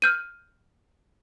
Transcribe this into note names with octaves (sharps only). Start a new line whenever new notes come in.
F6 G6 D#7